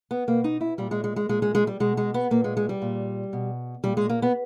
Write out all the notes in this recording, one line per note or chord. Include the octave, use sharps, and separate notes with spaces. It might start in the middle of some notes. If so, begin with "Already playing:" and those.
B3
B2 A#3
D#4
E4
A#2 G3
G#3
G#3
G#3
A#2 G#3
G#3
G#3
G3
B2 G#3
G#3
B3
A#2 A#3
G#3
G#3
G3
A#2
B2
A#2 G3
G#3
A#3
B3